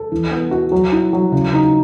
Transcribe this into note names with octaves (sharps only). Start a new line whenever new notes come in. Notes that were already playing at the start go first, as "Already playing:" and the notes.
Already playing: A4
E3
B3
F#4
F#3
E4
F#3
C#3
D#4